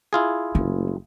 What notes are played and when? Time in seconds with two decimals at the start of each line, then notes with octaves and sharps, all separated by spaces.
0.13 E4 F4 G#4
0.55 F#1 A3